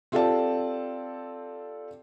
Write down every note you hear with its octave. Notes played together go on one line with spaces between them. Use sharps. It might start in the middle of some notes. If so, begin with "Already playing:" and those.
C4 F4 G4 A4 D5 A5